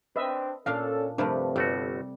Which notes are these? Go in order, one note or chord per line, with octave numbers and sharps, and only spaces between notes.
C4 D4 B4 D#5 E5
A#2 C#4 D4 A4 F5 C6
G2 C3 F3 A3 D4 A#4 B4
G1 G3 A3 F#4